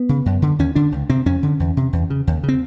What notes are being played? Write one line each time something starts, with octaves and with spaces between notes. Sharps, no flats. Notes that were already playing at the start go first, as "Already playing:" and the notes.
Already playing: B3
C#3
F#2
D3
D#2 C#4
D3 D4
C#2
C3 C4
F2 C#4
D3
E2
C3
E2
C#3
D#2
C#3
C4